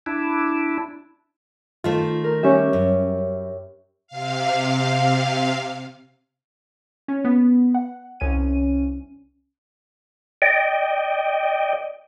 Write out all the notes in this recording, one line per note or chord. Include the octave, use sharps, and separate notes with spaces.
D4 E4
D#3 A3 F4 C5
A#4
G3 C#4 G4 C#5 E5
F#2
C3 F5
C#4
B3
F#5
C2 C#4 D#7
D5 D#5 G5